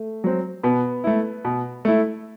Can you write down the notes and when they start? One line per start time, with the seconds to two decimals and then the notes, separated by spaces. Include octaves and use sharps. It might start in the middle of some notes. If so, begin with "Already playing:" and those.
Already playing: A3
0.24 F#3 C4
0.63 B2 B3
1.04 A3 E4
1.45 B2
1.85 A3 E4